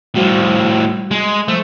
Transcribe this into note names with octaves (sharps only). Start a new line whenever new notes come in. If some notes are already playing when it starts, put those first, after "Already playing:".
A2 F3 G3 F#4 C5
G#3
F3 A3 C5 E6